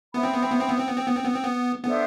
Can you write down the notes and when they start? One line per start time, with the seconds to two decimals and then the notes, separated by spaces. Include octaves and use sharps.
0.14 B3 C5 E5 B5
0.23 C4
0.33 B3
0.42 C4
0.51 B3
0.60 C4
0.69 B3
0.78 C4
0.88 B3
0.97 C4
1.06 B3
1.15 C4
1.25 B3
1.34 C4
1.43 B3
1.83 B3 D4 A4 C5 E5